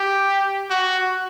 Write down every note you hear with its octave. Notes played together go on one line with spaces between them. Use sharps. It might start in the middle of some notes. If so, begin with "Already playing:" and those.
Already playing: G4
F#4